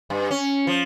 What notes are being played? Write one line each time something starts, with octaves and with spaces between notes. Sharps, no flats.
G2
C#4
F3